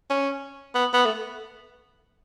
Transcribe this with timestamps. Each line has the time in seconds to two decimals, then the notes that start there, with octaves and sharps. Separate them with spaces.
0.10 C#4
0.75 B3
0.93 B3
1.06 A3